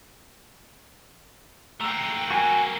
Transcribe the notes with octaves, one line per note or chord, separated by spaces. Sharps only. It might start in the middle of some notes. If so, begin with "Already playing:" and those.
A3 A#3 F#5 G5 A#5 E6 F7
F#4 G#5